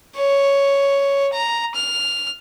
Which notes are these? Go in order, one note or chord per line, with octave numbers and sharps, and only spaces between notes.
C#5
A#5
F6